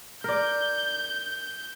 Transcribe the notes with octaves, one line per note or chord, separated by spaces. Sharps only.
A#4 D5 G6